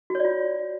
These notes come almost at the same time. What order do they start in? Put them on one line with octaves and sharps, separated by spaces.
F#4 C#5 D5 F4